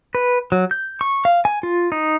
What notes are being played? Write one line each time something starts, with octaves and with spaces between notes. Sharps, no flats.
B4
F#3
G6
C#6
F5
G#5
F4
D#4